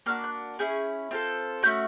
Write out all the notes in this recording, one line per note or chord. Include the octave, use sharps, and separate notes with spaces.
A#3 D4 F#4 F6
F#6
C#4 E4 G#4 G6
C4 F4 A4
A3 C#4 F#4 G6